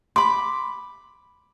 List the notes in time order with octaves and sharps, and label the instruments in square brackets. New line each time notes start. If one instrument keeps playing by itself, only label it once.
[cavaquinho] B5 D6 [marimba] C6